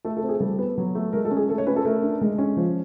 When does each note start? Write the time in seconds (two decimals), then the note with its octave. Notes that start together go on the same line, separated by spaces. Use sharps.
0.05 A3 A4
0.17 A4
0.23 C4
0.29 G#4
0.40 G3 A4
0.59 B3
0.78 F#3
0.95 A3
1.13 G#3 A#4
1.25 A4
1.31 C#4
1.37 G#4
1.49 A3 A4
1.58 C#5
1.67 C#4 B4
1.76 A4
1.85 A3 A#4
2.03 D4
2.21 G#3
2.38 C#4
2.57 F3